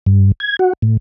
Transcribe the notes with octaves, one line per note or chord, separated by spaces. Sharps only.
G2
G#6
F#4
A2